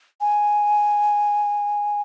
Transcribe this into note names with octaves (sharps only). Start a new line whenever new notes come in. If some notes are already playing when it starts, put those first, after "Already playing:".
G#5